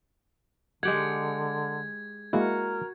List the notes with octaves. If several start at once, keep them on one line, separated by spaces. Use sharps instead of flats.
D3 G#3 G4 F#5 G#6
G#3 A#3 E4 F#4 A#4